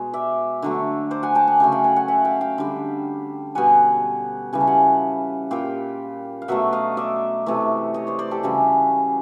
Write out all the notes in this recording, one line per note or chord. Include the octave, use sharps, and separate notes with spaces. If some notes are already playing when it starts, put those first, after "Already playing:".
Already playing: B2 G#3
D5 E5
D3 F#3 A3
C5 D5
F#5 G#5
G5 A5
F#5 G#5
C#3 F#3 A3 G#5
F5 G5
F#5 G#5
F#5 G#5
E5 F#5
F5 G5
F5 G5
D3 G3
B2 G3 F#5 G#5
C#3 E3 G3 G#5
A5
F#5 G#5
A#2 G3 F5 G5
F5
B2 F#3 A3 E5 F#5
D#5 F5
D5 E5
C3 E3 A3
C#5 D#5
C5 D5
C5 D5
G4 A4
C#3 E3 G3 F#4 G#4